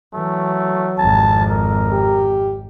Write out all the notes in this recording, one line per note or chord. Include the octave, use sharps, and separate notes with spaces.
E3 F#3 A3
G#1 F2 A5
A#4
G4